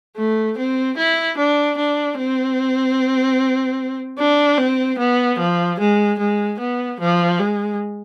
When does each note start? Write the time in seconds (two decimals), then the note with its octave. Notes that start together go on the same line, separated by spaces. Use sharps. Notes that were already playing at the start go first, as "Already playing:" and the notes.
0.17 A3
0.57 C4
0.97 E4
1.37 D4
1.78 D4
2.17 C4
4.18 D4
4.58 C4
4.98 B3
5.39 F3
5.79 G#3
6.19 G#3
6.59 B3
7.00 F3
7.40 G#3